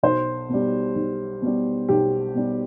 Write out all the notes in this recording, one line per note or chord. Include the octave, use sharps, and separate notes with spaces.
B1 C5
B2 G3
B1
B2 G3
B1 G4
B2 G3